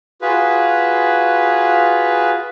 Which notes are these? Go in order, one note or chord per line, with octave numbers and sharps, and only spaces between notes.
F4 F#4 G#4 B4